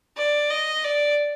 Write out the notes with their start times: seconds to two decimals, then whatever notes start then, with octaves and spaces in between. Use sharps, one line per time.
0.17 D5
0.50 D#5
0.84 D5